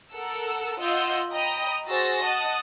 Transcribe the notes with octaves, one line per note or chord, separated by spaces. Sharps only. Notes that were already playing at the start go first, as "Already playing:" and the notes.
A4 A#4 F#5 E6
F4 D#5 F#5 E6 G6
D#5 G5 A#5 B5 D#6
F#4 G#4 C5 E6 A6 A#6
D#5 F#5 A5 D#6